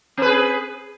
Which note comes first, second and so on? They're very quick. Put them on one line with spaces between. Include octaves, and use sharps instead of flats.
C4 B4 G#4